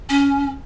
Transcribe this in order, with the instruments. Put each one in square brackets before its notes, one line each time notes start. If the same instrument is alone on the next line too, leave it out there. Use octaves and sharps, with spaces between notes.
[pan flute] C#4